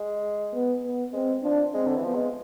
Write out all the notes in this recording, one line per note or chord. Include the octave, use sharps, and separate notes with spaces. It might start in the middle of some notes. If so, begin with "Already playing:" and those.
Already playing: G#3
B3
B3
G#3 C4
F3 D4
G#3 C4
D3
E3
F3 B3
G#3